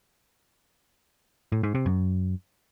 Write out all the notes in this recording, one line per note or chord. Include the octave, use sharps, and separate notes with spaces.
A2
G#2
C3
F#2